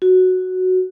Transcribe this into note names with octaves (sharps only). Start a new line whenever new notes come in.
F#4